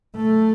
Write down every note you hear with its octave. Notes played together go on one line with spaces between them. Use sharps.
A3